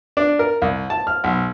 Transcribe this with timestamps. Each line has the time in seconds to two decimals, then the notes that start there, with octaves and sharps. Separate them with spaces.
0.17 D4
0.39 A#4
0.62 C2
0.90 A5
1.07 F6
1.24 B1